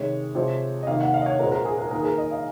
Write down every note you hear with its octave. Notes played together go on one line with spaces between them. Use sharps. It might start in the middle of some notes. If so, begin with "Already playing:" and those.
Already playing: C3 D#3 G#3 C#5
C3 F3 G#3 C4
D#5
C3 D#3 A#3 F5
F#5
F5
D#5
C#5
A#2 G#3 C4 A#4
A#4
G#4
A#4
D#3 A#3 A#4
G#4
A#4
D#5
F5